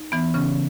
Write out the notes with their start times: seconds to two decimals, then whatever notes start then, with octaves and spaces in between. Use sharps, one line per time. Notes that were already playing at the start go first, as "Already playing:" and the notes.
Already playing: D#4
0.12 E3 B3
0.34 C#3 C#4